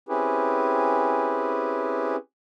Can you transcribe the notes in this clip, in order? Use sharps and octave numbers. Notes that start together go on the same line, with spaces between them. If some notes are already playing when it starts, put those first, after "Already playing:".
C4 C#4 E4 G4 G#4 B4